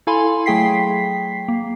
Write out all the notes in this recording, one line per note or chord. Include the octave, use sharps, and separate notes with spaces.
E4 A4 F5 G#5 B5 C6
F#3 A3 G#4 G5 B6 C7
A#3